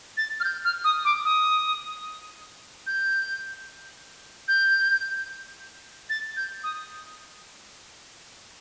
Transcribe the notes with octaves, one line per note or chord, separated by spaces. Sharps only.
A6
F6
G6
F6
D#6
D6
D#6
G6
G6
A6
G6
D#6